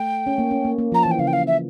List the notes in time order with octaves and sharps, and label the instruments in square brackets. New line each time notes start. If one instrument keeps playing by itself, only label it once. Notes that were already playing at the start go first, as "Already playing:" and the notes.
Already playing: [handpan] A3 [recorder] G5
[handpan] C#4
A#3
C#4
A#3
A#3
[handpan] F3 [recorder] A#5
[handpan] E3 [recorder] A5
[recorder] G5
[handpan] C#3 [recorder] F5
[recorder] G5
F5
E5